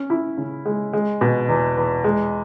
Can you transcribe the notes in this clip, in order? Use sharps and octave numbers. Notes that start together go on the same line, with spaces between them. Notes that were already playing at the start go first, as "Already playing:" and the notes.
Already playing: C#4
E4
C#3
G#3
G#3
B2
E2
E2
G#3